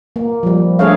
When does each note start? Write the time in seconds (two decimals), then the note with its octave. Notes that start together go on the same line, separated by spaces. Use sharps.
0.16 A#3
0.43 F3 G3
0.79 A3 D4 G#4 A4 C#5 F5